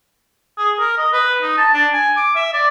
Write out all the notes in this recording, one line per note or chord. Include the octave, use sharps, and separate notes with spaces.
G#4
A#4
D#5
B4
D#4
A5
D4
G#5
D6
E5
D5